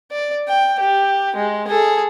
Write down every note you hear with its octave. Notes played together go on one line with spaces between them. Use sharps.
D5
G5
G4
G#3
G#4 A4